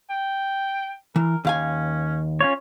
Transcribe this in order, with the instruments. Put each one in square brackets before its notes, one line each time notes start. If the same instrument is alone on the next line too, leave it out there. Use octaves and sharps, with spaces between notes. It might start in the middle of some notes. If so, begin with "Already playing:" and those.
[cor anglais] G5
[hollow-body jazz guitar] E3 [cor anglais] A#4
[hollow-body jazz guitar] D#2 F5 G#5 [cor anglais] C#4
[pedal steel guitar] C#4 F4 C#5